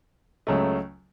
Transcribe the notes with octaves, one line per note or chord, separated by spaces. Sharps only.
C#2 C#3 F#3 A3